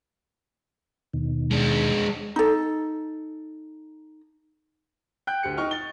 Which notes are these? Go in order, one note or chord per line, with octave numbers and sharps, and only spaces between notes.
D#2 B2 D#3
G#3 D4
D#4 A4
G5 F#6 G6
D2 G4 C#7
D#4 G5 C#6 F6
A6 G7